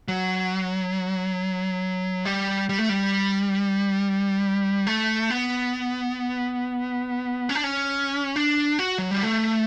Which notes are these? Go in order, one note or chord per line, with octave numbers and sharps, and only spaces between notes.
F#3
G3
G3
A3
G3
A3
B3
C#4
D4
C#4
D4
F#4
F#3
G3
A3